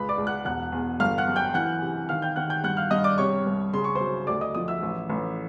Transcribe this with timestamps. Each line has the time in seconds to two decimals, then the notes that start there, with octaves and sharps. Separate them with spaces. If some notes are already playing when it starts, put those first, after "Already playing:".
Already playing: C#2 B4 B5
0.09 D5 D6
0.18 C#2
0.27 F#5 F#6
0.45 E1 F#5 F#6
0.72 E2
1.00 G1 F5 F6
1.18 F#5 F#6
1.28 F#2
1.36 G5 G6
1.54 E3 F#5 F#6
1.82 C3
2.09 D#3 F5 F6
2.22 G5 G6
2.36 D#3 F#5 F#6
2.50 G5 G6
2.64 G2 F#5 F#6
2.77 F5 F6
2.91 G2 D#5 D#6
3.04 D5 D6
3.18 C3 C#5 C#6
3.46 C2
3.73 C#3 C6
3.84 C#6
3.95 F#3 C5 C6
4.27 D2 D5 D6
4.41 D#5 D#6
4.55 F3 D#5 D#6
4.68 E5 E6
4.83 A1
5.09 A1